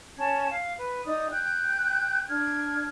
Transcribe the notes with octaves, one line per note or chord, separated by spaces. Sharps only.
C#4 A5 G#6
F5
B4
D#4 D5 D#6
G5 F#6 G6
D4 F6 G#6